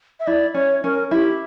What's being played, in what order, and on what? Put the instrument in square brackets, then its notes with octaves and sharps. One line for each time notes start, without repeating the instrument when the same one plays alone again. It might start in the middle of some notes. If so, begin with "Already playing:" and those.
[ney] E5
[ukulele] E4 [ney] D5
[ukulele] C#4 [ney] C#5
[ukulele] C#4 [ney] A#4
[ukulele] E4 [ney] G4